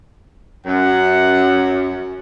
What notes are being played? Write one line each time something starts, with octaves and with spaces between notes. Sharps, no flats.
F#2 F#5